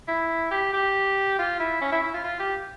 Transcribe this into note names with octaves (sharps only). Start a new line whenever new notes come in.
E4
G4
G4
F4
E4
C#4
E4
E4
F4
F4
G4